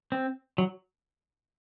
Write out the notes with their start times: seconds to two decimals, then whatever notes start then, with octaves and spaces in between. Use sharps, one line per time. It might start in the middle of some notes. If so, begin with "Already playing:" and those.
0.12 C4
0.58 F#3